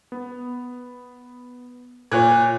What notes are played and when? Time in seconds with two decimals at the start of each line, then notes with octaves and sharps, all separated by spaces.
0.12 B3
2.12 A#2 C#5 F#6 G#6